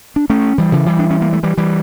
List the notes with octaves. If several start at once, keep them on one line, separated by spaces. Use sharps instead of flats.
D4
A3 C#4
E3 G3
C#3 E3
E3 G3
D4
C#4
A#3
A3
E3 G3
E3 G3